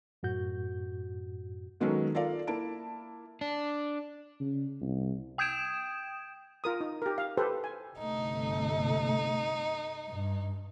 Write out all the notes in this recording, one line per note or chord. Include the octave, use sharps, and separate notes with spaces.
F#2 A2 F#4 G6
D#3 F#3 G#3 B3 C#4 A4
F4 A4 A#4 D5 F5
A#3 E4 A5 D7
D4
C#3
C2
G5 D#6 G6 G#6 D7 E7
F4 A#4 D#6
D#4
G4 A#4
F5
G4 A4 B4 C5
G#5
G1 C3 A3 D#4
G2